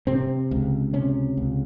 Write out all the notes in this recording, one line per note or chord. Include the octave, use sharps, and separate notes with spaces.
C3 C4
C#2
C3 C#4
C#2